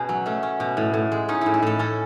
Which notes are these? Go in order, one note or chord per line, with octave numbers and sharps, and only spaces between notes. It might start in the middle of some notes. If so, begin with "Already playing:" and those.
Already playing: B2 B3 C#4 G#4
F#3
A3 C#4
C#4
B2
A2
A2
G#3
C#4 D#4
A2 E4
E4
A2 A4
C#4 A4